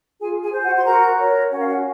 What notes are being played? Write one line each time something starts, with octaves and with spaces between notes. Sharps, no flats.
F4 G#4 G#5
G#4 G#5
C5
F#4 F#5
C6
F#4 A#4 A#5
A#4 C#5
C#4 F#5
F5
F#4 F#5